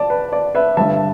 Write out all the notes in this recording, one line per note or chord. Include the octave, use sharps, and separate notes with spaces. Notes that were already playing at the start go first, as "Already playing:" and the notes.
Already playing: D5 A5
B4
D5
B4 E5
G1 G2 G3 E5 A5